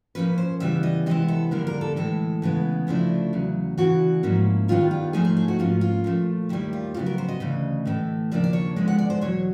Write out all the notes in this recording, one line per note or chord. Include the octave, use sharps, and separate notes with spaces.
A#2 F3 A#3 C#4 B4
C5
C#3 E3 G3 B3 E5
D#5
C3 E3 G#3 B3 E4 D#5
A4
F2 D3 G3 A#3 D4 A#4
A#4
A4
A2 E3 G#3 A4
C#3 E3 G#3 B3
D2 C#3 F3 A3 D4 E4
E2 C#3 F#3
D2 C#3 E3 F#4
G#2 F3 A#3 C#4 E4
G2 D#3 G3 B3 F4
F4
G#2 F3 A3 C4 D#4 G#4
G#4
G#4
F#4
G#2 F3 A#3 C#4 F4
F4
A#2 F3 A3
D#2 D#3 G3 E4
F4
F2 C#3 F#3 B3 F4
A#4
C5
D#5
D2 C#3 E3
A2 E3 A3
D#2 C#3 F3 A#3 D4 D5
D5
C#5
D3 F3 G#3 B3 E4
F#5
D5
C5
E2 B2 F#3 C#5